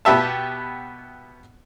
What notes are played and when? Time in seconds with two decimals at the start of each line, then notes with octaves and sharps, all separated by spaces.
0.05 B2 B3 G4 E5 A5